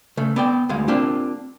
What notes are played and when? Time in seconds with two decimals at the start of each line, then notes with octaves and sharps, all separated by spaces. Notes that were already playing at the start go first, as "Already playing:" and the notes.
0.17 C#3 A3
0.36 B3 D5 G5
0.69 D2 G#3 F5
0.88 A#3 C4 D4 F4 G4